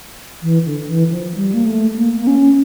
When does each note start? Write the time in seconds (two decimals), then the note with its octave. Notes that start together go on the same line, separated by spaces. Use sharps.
0.42 E3
0.65 D3
0.88 E3
1.11 F3
1.34 G3
1.54 A#3
1.65 A3
1.96 A#3
2.20 A#3
2.27 C#4